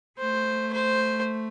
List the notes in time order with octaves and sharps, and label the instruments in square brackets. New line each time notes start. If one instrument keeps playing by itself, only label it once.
[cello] A3 [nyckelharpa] C5
[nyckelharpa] C5